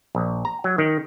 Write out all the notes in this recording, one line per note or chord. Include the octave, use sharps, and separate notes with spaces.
A#1
A#5
F#3
D#3